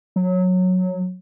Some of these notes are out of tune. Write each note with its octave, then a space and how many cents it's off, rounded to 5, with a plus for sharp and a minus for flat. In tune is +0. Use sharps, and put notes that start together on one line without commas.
F#3 -15